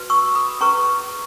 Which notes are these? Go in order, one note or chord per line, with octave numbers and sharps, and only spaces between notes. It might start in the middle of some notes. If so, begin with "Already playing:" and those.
Already playing: F#4 B4
C#6 E6
B5 D#6
C#4 G#4 B4 A#5 C#6